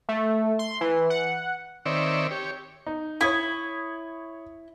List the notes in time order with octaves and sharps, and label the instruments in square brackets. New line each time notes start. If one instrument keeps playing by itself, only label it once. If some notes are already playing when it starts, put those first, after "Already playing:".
[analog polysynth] A3
C6
E3
F#5
[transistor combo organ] D#3 C4 C#5 D5 E5
G4 C#5
[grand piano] D#4
[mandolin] E4 [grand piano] C#5 D#6 G#6